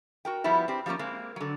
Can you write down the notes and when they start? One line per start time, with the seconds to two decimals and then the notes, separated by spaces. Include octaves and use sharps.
0.25 F#4 A#4 G5
0.44 F3 G3 B3 E4 F#4
0.68 C4 G4
0.86 F3 G3 G#3 A#3 C#4
0.99 G#3 A#3 C4
1.36 D3 F#3